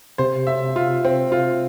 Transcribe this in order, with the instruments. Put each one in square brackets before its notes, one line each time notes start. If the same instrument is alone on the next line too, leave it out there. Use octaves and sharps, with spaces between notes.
[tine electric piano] C3 [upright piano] C5
[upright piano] E5
F4
C4
F4